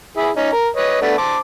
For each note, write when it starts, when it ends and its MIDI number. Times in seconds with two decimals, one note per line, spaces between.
0.17 0.30 64
0.17 0.30 68
0.36 0.50 61
0.36 0.50 63
0.52 0.68 70
0.76 0.99 71
0.76 0.99 73
0.76 0.99 75
1.02 1.17 57
1.02 1.17 59
1.02 1.17 62
1.18 1.38 72
1.18 1.38 81
1.18 1.38 86